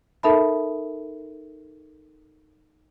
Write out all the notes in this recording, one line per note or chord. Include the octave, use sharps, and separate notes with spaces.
D#4 A4 A#4 E5 A5 B5